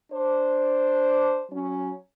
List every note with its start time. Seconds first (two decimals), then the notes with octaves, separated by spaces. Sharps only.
0.13 D4 C5
1.51 F#3 C#4